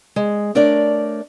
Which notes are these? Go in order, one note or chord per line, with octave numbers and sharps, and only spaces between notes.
G#3
A3 D4 A#4 C#5 D5